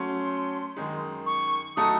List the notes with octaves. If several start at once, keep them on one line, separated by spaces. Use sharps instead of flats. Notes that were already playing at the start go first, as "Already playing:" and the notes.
Already playing: F#3 A3 C#4 C6
F#2 D#3 G#3 D#4
C#6
F#3 A3 D#4 F#4 A4 D#6